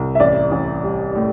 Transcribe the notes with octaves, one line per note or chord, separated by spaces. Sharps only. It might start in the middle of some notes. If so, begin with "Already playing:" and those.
Already playing: C2
E5
A1 D5
A1
G3
A2